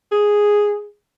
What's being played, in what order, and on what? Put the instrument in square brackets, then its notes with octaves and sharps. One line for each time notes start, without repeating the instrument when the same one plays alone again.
[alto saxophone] G#4